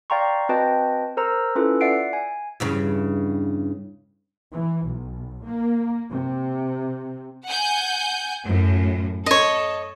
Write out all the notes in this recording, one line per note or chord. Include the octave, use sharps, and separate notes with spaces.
D5 F5 G5 A#5 C6 C#6
C4 F#4 B4 D#5 G5 A5
A#4 C5 A#5 E6
C#4 E4 F4 A4 B4
D5 E5 F#5 C7 D7
G#5
E2 G2 C#3
E3
B1
A#3
C3
F#5 G#5 G6
F#2 A2
A4 C#5 D#5